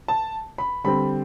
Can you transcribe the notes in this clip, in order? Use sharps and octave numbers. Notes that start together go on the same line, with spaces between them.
A5
B5
D3 G3 C4 B5